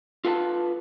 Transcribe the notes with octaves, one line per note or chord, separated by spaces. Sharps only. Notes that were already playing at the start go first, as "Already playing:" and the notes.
F4 A4 B4 G5 A5